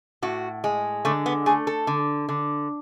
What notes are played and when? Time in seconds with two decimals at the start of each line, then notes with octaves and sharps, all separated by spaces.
0.22 A2 F#4
0.64 G#3
1.05 D3 A3
1.26 B3
1.46 A3 G#4
1.67 A4
1.87 D3
2.29 D3